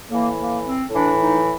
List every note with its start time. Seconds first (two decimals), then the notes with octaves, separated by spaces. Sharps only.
0.09 A2 E3 A#3
0.37 A#3
0.63 C4
0.90 A2 E3 D4
1.17 D#4